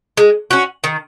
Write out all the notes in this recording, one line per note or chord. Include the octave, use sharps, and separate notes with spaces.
G#3
C#4 F#4
D#3